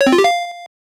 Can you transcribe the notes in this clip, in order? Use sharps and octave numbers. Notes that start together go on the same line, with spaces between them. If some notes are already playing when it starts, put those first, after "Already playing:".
C#5
C4
F4
G4
F5